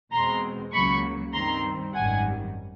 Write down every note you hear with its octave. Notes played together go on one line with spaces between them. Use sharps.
E2 B2 G#3 C4 A#5 C6
C#2 C#3 F#3 A#3 B5 C#6
G2 D#3 G3 C4 A#5 C6
G#1 F#2 D#3 G3 F#5 G#5